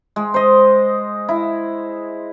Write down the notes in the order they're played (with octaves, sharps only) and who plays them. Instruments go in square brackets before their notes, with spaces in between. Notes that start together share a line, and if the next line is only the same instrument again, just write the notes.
[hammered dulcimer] G#3
C5 D#5
E4